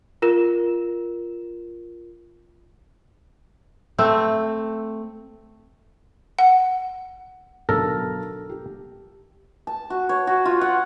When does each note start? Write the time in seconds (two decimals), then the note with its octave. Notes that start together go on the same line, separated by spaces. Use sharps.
0.22 F4 A#4 E7
3.98 A3 C4
6.39 F#5
7.69 B1 D3 A4 A#4 A#5
8.50 G4
9.67 A5
9.90 F#4
10.09 C#5
10.27 F#4
10.45 F4
10.61 F#5